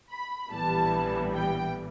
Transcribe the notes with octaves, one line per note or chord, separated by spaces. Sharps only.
B5
A#1 A2 E3 G3 B3 A5
G5